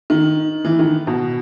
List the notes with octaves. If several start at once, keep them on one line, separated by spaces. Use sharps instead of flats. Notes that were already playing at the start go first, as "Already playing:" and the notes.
D#3
E3
D#3
B2